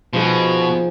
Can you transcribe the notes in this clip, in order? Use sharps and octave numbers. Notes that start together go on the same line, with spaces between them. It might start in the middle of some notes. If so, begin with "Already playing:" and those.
B2 F3 D#4 G#4